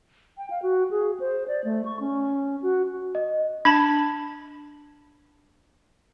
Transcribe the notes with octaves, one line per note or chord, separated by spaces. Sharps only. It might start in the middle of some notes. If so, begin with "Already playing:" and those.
G5
F5
F#4
G#4
C5
D5
A3
C#6
C#4
F#4
D#5
D4 A5 B5 G#6